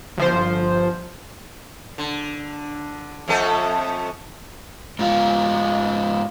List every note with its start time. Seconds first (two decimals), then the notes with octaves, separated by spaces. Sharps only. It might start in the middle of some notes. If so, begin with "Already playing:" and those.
0.17 G1 F3 C5
1.98 D3
3.28 F2 A3 A4
4.99 G#2 F4